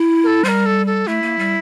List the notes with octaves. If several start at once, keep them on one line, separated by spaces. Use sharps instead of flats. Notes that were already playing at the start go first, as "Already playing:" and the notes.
Already playing: E4
A#4
A4
G3 A#4 C5
A4
A4
A3 E4
A#3
G3